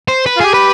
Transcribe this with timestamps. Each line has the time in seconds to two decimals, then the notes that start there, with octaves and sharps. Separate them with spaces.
0.08 C5
0.26 B4
0.37 F4
0.41 G4 G#4
0.54 B4